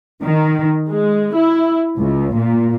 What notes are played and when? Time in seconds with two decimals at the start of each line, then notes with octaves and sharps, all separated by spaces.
0.22 D#3
0.90 G#3
1.34 E4
1.97 C#2
2.35 A#2